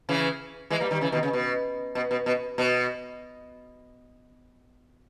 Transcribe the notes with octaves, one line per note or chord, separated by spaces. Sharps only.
C#3 E3
E3 G#3
G3 A#3
D#3 G3
C#3 E3
B2 D#3
C#3
B2
B2
B2
B2
B2